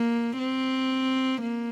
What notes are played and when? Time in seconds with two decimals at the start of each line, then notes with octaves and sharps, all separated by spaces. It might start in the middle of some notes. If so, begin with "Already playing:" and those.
Already playing: A#3
0.39 C4
1.41 A#3